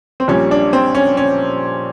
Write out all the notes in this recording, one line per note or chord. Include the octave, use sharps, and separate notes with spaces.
C4
A#1 A#2 G3 C#4
D4
C4
C#4
C#4